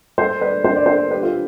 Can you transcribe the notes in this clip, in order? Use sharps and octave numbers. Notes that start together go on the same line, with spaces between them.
A4 C5
B4 D5
C5
D5
A4 C5
G4 B4
F4 A4